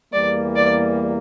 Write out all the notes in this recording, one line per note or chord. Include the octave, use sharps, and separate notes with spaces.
E2 E3 G3 A#3 D5
D5